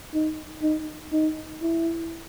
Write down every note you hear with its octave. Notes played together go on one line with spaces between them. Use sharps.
D#4
D#4
D#4
E4